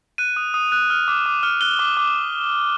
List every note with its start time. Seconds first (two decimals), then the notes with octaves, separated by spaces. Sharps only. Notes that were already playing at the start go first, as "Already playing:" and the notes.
0.18 F#6 D#7
0.36 D#6
0.54 D#6
0.72 F#6
0.90 F6
1.08 D6
1.26 D6
1.43 F6
1.61 F#6 G7
1.79 D6
1.97 D6